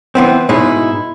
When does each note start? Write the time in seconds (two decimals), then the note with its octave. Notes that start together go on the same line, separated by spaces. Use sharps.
0.15 E3 B3 C4
0.49 G#2 B2 G#3 D#4 E4